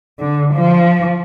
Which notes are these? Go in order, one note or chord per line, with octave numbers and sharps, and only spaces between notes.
D3
F3